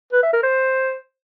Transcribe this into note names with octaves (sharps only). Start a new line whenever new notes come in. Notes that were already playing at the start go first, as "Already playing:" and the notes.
B4
E5
A#4
C5